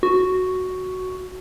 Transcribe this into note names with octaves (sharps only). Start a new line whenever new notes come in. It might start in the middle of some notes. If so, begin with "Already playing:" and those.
F#4